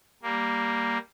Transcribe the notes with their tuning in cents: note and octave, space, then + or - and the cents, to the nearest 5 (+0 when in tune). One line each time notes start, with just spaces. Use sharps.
G3 +0 A#3 +0